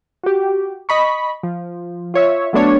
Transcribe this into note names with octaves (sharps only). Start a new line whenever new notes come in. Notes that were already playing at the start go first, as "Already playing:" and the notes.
F#4 G4
D#5 B5 C#6
F3
F4 C#5 E5
F#3 A3 B3 D4 C#5